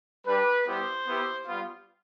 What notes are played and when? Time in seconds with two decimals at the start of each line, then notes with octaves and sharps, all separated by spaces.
0.26 G3 D4 G4 B4
0.66 G3 B3 E4 G4 C5
1.07 B3 E4 G4
1.47 G3 B3 F4